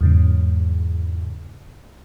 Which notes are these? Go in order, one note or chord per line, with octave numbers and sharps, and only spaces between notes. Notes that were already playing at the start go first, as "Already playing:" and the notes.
E2 G#2 C#3